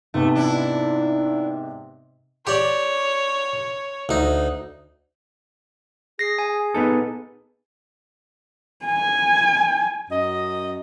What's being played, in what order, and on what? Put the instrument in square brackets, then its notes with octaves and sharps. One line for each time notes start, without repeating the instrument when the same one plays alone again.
[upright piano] G#2 C3 B3 [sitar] A3
[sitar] D4 E4
[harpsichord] G4 D5 [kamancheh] C#5
[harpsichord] D2 D#4
[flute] G#4 [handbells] A#6 C7
[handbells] G#5
[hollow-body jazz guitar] B3 D#4 A4
[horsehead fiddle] G#5
[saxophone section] F#2 D#5